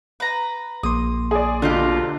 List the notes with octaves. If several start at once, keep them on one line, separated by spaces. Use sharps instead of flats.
B4 A#5
A#1 A#3 C6 D#6
G#4 D5
B2 D3 C4 D#4 F4 G4